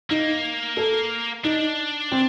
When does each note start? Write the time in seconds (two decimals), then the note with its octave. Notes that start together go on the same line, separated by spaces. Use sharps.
0.10 A#3 D#4
0.77 A4
1.44 D4 D#4
2.12 C4